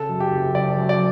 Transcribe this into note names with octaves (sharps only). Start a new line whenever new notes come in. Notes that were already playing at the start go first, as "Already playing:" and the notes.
Already playing: C#3 A4
F#2
G4
F#1
F#1 D5
F#2
D5